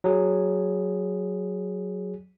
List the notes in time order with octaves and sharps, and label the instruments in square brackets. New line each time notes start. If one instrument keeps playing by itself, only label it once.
[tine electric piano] F#3 G#4